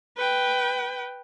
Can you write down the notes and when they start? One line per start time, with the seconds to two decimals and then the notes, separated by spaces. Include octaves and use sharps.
0.17 B4 G5